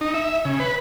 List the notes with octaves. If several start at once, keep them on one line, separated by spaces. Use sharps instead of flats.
D#4
E5
C#3
B4